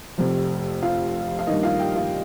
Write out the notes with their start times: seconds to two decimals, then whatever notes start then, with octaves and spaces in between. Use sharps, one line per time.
0.18 F1 F2 C3
0.82 F4 F5
1.39 F5
1.47 G2 D#3 A#3 D#4 D#5
1.63 F4 F5
1.79 G4 G5
1.96 F4 F5